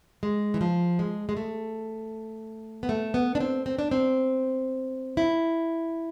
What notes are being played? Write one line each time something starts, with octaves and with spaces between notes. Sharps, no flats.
G#3
E3
F3
G#3
G#3
A3
B3
A3
B3
D4
C4
C4
D4
C4
E4